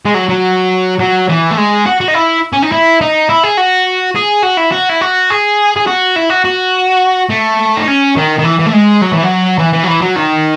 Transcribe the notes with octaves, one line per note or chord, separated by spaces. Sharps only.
G#3
F#3
F#3
F#3
E3
A3
G#3
F#4
F#4
D#4
E4
C#4
D#4
E4
D#4
E4
G#4
F#4
G#4
F#4
E4
F#4
E4
F#4
G#4
G#4
F#4
E4
F#4
F#4
A3
D#4
C#4
D#3
D#3
E3
E3
A3
G#3
F#3
E3
F#3
E3
E3
F#3
E3
F#3
D#3